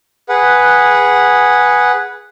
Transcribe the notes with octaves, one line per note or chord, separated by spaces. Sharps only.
G#4 B4 F#5